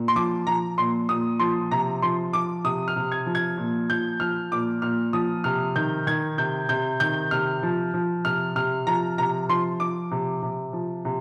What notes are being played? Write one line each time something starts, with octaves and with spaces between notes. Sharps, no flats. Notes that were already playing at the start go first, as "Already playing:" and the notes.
Already playing: A#2
C6
F3 D6
F3 A#5
A#2 C6
A#2 D#6
F3 C6
C3 A#5
F3 C6
F3 D6
C3 D#6
F6
C3
G#6
F3
G#6
A#2
F3 G6
F3 F6
A#2 D6
A#2 F6
F3 D#6
C3 F6
D#3 G6
D#3 G#6
C3 G6
C3 G6
D#3 G6
C3 F6
F3
F3
C3 F6
C3 F6
F3 A#5
C3 A#5
F3 C6
F3 D6
C3
C3
F3
C3